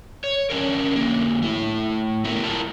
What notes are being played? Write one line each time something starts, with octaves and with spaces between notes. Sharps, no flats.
C#5
C#4 D4 A#4
D3 A#3
A3 E4
A3 B3 E4 A#4
E4 F4 A#4 A5